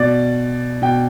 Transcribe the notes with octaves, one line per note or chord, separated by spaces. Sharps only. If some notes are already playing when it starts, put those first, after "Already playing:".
Already playing: B2 D5
B2 G5